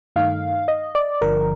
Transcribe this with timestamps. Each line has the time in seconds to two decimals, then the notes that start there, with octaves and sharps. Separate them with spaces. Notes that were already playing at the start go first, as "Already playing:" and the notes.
0.16 G2 D#3 A3 D#4 F5
0.68 D#5
0.95 D5
1.21 G1 G2 D3 F3 A#4